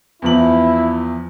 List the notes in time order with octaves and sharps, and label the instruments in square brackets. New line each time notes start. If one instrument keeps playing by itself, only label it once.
[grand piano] E2 F3 F#7 [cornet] E4